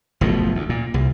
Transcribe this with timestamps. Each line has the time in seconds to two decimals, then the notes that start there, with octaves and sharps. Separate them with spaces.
0.21 F#1 B2 F3 A3
0.55 D2
0.69 A#2
0.94 C2